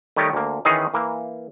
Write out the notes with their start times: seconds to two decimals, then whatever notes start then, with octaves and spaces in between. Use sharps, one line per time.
0.16 D#3 G3 A3 G4 C#5 D#5
0.33 D2 A#3
0.65 D#3 E3 C#4 D#4 G#4 D#5
0.94 E3 A#3